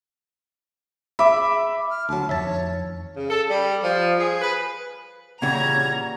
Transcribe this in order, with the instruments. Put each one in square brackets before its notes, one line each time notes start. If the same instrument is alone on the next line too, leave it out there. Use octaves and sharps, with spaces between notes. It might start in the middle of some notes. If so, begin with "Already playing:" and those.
[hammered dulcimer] E5 [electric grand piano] B5 D6
[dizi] F6
[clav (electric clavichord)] D2 F#3 [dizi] A5
[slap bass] F2 D#3 [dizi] C#5 [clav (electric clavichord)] E5 A5
[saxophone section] C#3
A4
G3
F3
G#4
B4
[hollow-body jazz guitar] A#2 C#3 [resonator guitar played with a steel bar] E3 G3 F#5 [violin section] C#5 A#5 [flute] G#6